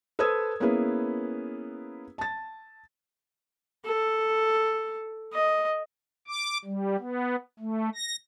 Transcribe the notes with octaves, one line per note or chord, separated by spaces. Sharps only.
A4 B4 C5 D#6 E6 G#6
A#3 B3 C#4 E4 G#4 B4
A5 A6
A4
D#5
D6
G3
B3
A3
A#6